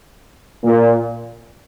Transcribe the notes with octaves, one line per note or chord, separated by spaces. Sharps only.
A#2